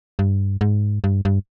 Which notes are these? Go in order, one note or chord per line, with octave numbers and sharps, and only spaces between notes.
G2
G#2
G2
G2